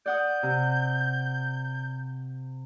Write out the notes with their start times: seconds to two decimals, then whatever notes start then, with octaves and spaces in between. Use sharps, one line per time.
0.06 D5 F#5 D#6 G6
0.43 C3